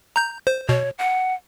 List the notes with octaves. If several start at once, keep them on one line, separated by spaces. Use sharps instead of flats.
A#5 G6
C5
B2 C#5
F#5